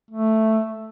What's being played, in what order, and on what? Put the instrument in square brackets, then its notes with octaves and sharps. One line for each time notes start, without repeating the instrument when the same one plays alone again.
[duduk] A3